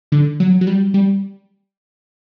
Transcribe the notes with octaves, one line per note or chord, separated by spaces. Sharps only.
D3
F#3
F#3
G3
G3